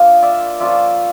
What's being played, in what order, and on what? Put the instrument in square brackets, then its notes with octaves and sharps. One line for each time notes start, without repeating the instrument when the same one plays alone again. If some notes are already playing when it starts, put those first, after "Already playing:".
Already playing: [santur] A#3 D4 F4 D#5 F5
D5 E5
F3 A#3 C#4 F4 D5 E5